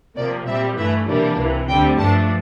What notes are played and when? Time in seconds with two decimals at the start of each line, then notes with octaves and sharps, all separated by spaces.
0.16 C3 F3 A#3 D5
0.47 A#2 G3 C4 E5
0.77 G2 E3 A3 E5
1.07 C3 E3 G3 A#3 D4
1.38 C2 C3 E3
1.68 D2 D3 G3 C4 G5
1.98 G2 F3 A3 D4 A5